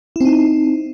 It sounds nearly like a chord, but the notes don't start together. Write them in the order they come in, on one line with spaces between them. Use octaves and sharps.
E4 C4 D#4